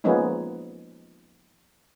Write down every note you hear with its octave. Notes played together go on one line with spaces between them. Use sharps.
F3 G#3 A#3 B3 C#4 D#4